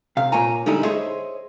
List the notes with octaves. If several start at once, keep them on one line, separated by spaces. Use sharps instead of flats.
C3 F5
A#2 A#3 C#5 G#5 A#5
D3 G3 G#3 D#4 E4 G#5
G#4 C5 C#5 D#5 E5